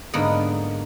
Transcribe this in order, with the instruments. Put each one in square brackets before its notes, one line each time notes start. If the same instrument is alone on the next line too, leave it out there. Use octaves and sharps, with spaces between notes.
[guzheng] G#2 D3 A#3 B3 D#5